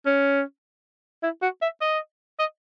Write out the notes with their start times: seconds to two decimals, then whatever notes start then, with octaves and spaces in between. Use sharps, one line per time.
0.06 C#4
1.23 E4
1.42 F#4
1.62 E5
1.81 D#5
2.39 D#5